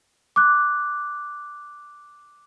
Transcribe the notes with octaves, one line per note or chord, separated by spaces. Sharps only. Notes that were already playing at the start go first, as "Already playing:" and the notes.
D6 F#6